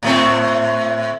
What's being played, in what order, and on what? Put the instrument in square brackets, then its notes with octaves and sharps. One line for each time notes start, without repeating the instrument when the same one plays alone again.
[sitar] A2 A3 C4